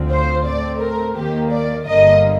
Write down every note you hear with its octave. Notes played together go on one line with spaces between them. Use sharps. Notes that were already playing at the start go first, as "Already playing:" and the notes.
Already playing: D2 D3 F3 C4
C5
A2 A3 C4 D5
A#4
D#2 D#3 A#3 G4
D5
G1 G2 D3 G3 A#3 D#5